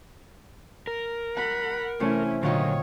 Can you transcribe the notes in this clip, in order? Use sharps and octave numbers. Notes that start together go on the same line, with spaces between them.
A#4
F#5 B5
C3 E3 A3 C#4 E4
F#2 A#2 D3 D#3 F4 C#5 D#5